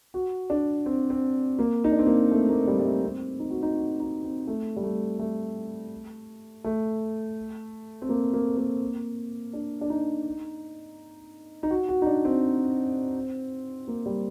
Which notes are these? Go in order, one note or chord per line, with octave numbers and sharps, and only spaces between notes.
F#4
D4
C4
C4
A#3
D#4
D4
C4
A#3
A3
A#3
G3
G3
A3
C4
D#4
F#4
D#4
F#4
D#4
C4
A3
G3
A3
A3
A3
C4
A#3
A#3
A#3
D4
D4
D#4
D#4
F#4
F#4
D#4
D4
C4
A#3
G3